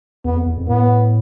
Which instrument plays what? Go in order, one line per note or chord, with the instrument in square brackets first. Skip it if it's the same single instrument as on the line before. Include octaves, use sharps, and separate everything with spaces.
[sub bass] E2 [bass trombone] B3
[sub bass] F2
E2
F2
[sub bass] A2 [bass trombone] B3